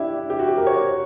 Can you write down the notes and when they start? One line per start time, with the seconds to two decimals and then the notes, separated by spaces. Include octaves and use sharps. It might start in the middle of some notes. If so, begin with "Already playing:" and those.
Already playing: D4 E4 G4
0.30 G4
0.39 F#4
0.48 G4
0.57 A#4
0.67 C#5